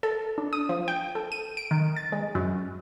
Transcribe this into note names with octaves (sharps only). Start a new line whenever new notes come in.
A4
D4
D#6
F3
G5
A4
D#7
D7
D#3
A6
G#3
F#2